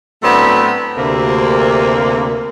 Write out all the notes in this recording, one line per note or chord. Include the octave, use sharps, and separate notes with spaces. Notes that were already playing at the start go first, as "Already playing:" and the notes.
A2 F#3 A3 B3 C4 D4
D2 C3 A#3